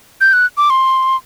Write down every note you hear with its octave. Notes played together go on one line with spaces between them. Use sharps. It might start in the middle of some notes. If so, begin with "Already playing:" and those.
G6
F#6
D6
C6